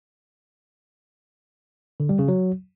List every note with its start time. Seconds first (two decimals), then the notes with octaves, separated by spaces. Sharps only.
2.00 D3
2.09 G3
2.19 C#3
2.28 F#3